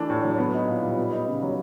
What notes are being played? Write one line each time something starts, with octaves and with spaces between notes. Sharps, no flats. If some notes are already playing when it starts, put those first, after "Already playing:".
Already playing: E3 A3 D4
A2
F#3
B3
D#4
A#2
G3
B3
D#4
C#3
F#3